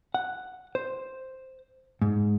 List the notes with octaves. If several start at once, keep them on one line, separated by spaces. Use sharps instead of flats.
F#5
C5
G#2